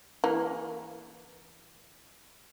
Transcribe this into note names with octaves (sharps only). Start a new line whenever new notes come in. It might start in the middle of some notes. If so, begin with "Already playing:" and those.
E3 A#3